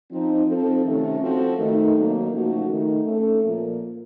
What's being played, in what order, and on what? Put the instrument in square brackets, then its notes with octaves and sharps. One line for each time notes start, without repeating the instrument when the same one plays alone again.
[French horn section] F3 C4 D#4
F3 C4 D#4 A4
C3 D#3 A3 C#4
F3 C4 F#4 A4
D#3 A3 D#4
C3 D#3 F#3 A#3
C#3 F3 A3 D#4 F#4
D#3 A3 D#4
A3 C#4 A4
A#2 F3 A#3